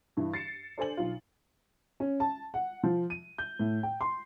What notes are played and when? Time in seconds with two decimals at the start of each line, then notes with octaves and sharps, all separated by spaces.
0.17 G2 E3
0.34 A6 C7 C#7 E7
0.78 D4 A4 C5 G#5 F#7
0.97 B1 F4
2.00 C#4
2.20 A5
2.54 F#5
2.84 F3
3.10 D#7
3.38 G6
3.59 A2
3.83 G5
4.01 C6